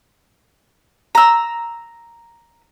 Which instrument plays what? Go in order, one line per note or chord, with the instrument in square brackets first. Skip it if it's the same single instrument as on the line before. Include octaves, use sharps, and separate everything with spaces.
[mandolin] A#5 E6